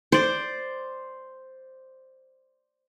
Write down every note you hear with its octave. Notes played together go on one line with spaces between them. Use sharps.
C5 D5